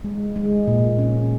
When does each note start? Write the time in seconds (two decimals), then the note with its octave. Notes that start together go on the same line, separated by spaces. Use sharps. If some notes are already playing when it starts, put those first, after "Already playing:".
0.04 G#3
0.36 G#3
0.67 A#2
0.98 C#4